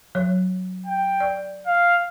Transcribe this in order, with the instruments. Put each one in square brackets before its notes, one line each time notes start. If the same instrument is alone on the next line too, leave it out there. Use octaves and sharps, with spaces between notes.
[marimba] F#3 C#5
[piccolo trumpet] G5
[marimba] D5
[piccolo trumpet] F5